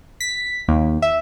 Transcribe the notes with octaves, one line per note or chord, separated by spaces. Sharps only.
B6
D#2
E5